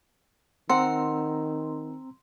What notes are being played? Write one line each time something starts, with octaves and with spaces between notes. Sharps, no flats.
D#3 C4 F#5 A#5 C6 E6